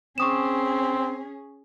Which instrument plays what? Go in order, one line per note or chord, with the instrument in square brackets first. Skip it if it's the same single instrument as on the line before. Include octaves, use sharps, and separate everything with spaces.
[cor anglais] C4 [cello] C#4 G#4 [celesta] C#6 D#6 E7